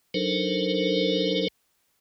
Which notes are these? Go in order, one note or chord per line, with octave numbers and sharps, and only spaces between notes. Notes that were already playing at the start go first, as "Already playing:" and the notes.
F#3 D4 D#4 A4 A#4 C5